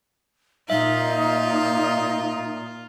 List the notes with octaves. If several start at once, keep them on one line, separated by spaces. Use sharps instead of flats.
A#2 D#4 F4 E5